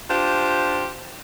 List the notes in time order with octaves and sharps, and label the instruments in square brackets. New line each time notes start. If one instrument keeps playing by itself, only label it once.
[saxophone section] D4 F4 G4 C5